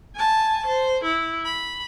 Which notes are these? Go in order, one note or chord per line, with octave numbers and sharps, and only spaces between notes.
G#5 A5
C5
E4
B5